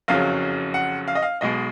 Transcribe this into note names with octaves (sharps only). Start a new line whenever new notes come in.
F#1 F2 C#3 F#3 F5
F#5
F5
D#5
F5
B1 B2 G#3 D#5